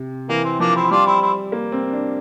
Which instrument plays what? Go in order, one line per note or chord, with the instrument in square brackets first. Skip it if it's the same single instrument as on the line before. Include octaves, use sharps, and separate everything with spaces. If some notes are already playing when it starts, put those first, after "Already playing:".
Already playing: [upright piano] C3
[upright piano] E3 [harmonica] A#3
[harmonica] C4
[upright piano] F3 [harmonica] A#3 D4
[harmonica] C4 E4
E4
[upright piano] G3 [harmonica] D4 F4
[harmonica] C4 E4
C4 E4
[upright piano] A#3
C4
D4